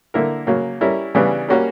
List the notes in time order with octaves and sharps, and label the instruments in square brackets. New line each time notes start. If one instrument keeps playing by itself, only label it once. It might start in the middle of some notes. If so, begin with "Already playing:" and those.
[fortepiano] D3 A#3 E4 A#4
C#3 F#3 A#3
G3 C#4 E4 A#4
C#3 E3 G3 B3 D4
G3 A#3 C#4 F#4 A#4